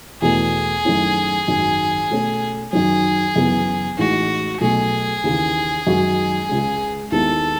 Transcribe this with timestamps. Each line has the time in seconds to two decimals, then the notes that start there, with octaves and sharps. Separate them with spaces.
0.22 E2 B2 A3 G#4
0.85 F#2 D#3 A3 C#4 E4
1.47 G#1 F#2 D#3 F#3
2.10 B2 A3 C#4
2.73 F#2 D#3 F#3 G#4
3.36 F#2 C#3 E3 B3
3.98 A1 A2 G#3 D#4 F#4
4.61 B1 B2 A3 G#4
5.24 D#2 C#3 E3
5.87 F#2 D#3 G#3 D#4 F#4
6.49 C#2 C#3 G#3
7.12 D#2 D#3 G#3 B3 E4 A4